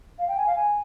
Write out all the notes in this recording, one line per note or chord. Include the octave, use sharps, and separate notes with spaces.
F5
G5
G#5
F5
G#5